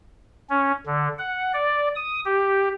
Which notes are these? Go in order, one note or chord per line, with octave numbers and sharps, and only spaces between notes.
C#4
D3
F#5
D5
D#6
G4